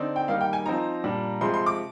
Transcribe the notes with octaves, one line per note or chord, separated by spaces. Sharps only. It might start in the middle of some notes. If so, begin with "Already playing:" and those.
Already playing: D3 C4 D#4 D5
G5
D#3 G3 A#3 D#4 F5
G5
G#5
F3 C4 D#4 A#5
A#2 G3 D4
C3 F3 G#3 C6
C6
D6